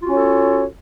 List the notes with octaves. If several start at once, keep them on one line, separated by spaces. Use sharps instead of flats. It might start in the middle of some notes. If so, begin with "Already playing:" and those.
C#4 F4 F#4 A4 C#5